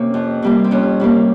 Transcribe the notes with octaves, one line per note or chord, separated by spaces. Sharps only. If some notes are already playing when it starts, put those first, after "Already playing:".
Already playing: C3 A#3 C#4
F2
C3 G3 A#3
C4
F2 C#4
C3 G3 A#3